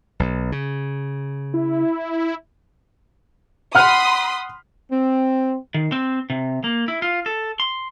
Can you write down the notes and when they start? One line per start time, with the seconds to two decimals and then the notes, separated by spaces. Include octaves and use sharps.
0.20 B1
0.52 C#3
1.54 E4
3.75 F#5 B5 C6 D#6 F6 F#6
4.92 C4
5.74 D#3
5.92 C4
6.30 C3
6.64 A#3
6.88 E4
7.02 F4
7.26 A4
7.60 C6